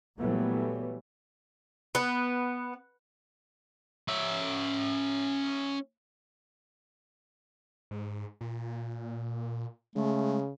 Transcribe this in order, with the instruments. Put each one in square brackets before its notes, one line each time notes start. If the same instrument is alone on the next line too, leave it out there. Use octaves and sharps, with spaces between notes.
[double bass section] A#2 E3 F#3 G3 A3 B3
[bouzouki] B3
[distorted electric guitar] C#4 E5
[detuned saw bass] G#2
A#2
[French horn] C#3 [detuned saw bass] G#3 [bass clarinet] A3